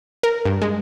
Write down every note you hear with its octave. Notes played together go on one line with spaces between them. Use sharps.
A#4
G2
G#3